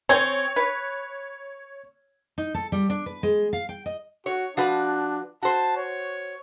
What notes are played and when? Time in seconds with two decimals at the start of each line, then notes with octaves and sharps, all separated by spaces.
0.09 C4 C#5 G#5 G#6
0.56 B4
2.38 D#4
2.54 A4
2.72 G3
2.90 D4
3.06 B4
3.23 G#3
3.53 F5
3.69 G5
3.86 D#5
4.26 F#4 C#5
4.57 F3 D4 F#4 B4
5.43 F#4 C5 A5
5.76 C#5